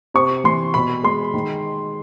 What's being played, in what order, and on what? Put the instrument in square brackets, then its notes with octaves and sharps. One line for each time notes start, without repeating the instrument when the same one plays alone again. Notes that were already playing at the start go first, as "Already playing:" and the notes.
[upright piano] C3 C#6
E3 C6
B2 B5
G#3 C6
D#3